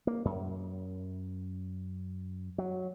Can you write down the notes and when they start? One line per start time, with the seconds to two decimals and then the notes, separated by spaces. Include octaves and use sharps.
0.07 A#3
0.25 F#2
2.58 F#3